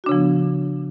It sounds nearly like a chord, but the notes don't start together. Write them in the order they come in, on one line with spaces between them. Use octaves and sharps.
F#4 D4 C#3 F3 B3